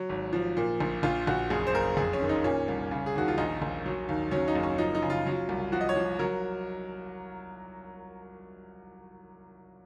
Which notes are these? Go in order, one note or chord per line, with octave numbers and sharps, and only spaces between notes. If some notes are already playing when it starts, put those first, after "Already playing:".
Already playing: F#3
G#1
F3
A#2
A#1
A#1 F4
A#1 F#4
F#1 G#4
C5
F#1 A#4
F2 G#4
C#4
D#3
D#4
A#2 C#4
C2
C#3
G#4
D#2 F#4
F4
A#1 D#4
A#1
F#3
D#2
F#3 C#4
D#4
F#1
C#4
F3 D#4
D#4
C#3
F4
F#3
C2
F3 F#4
D#5
C#5
F3
F#3 A#4